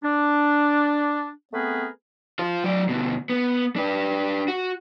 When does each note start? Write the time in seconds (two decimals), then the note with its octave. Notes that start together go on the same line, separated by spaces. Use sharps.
0.03 D4
1.53 A3 B3 C4 G#4 A#4 B4
2.39 F4 C5
2.64 F#3 D5
2.89 D2 B2
3.30 B3
3.76 D4 B4
4.48 F#4